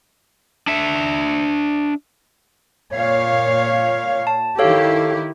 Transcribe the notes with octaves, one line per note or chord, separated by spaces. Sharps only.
D4 E5
A#2 C#5 F5
A5
D#3 E4 G4 A4 C#5 F5